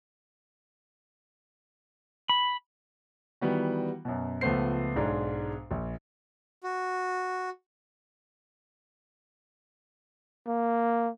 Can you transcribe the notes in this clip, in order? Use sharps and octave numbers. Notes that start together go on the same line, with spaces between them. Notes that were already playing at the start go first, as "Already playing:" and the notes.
B5
D#3 E3 G3 B3 F#4
F#2 B2
C#2 F3 A3 B3 C5 C7
B1 G#2 G#3 D4
A#1
F#4
A#3